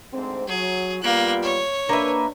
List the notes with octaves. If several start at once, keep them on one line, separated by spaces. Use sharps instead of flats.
D2 G#2 C4
F#3 G#4
G3 A#3 B3 F4 F#6
C#5
A#3 D4 B4 E5